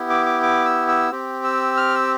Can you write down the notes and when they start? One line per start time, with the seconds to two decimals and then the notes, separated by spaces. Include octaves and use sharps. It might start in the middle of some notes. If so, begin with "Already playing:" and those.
Already playing: B3 E4 G4
0.10 D6
0.26 D6
0.43 D6
0.65 E6
0.88 E6
1.11 C4 G4
1.44 E6
1.77 F6
1.95 E6